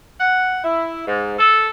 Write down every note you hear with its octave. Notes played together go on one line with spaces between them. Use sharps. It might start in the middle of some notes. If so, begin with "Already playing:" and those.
F#5
E4
G#2
A4